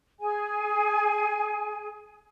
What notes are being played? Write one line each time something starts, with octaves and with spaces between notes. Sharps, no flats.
G#4 G#5